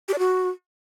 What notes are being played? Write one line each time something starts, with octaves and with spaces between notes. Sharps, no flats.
G4
D5
F#4